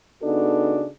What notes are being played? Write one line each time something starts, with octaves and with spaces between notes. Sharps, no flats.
C#3 B3 D4 D#4 F#4 A4